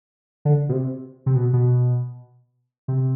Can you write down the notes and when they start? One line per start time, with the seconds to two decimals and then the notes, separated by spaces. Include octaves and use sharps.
0.45 D3
0.69 B2
0.72 C3
1.26 C3
1.35 B2
1.53 B2
2.88 C3